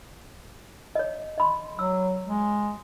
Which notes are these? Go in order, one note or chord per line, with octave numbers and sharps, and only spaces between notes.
C#5 D#5
D#5 B5 C6
F#3 E6
G#3